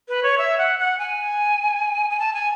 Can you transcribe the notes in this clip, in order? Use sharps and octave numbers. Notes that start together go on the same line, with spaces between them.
B4
C#5
E5
F#5
F#5
G#5
G#5
A5
G#5